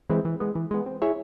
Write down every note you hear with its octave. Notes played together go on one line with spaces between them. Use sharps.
E3 G#3 C4 E4
E3
G#3 B3
E3
G#3 B3
C4
E4 G#4 C#5 E5